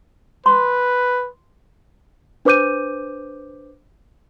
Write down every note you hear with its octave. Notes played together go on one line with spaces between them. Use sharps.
B4 C6
D4 B4 C5 D6 G6 D#7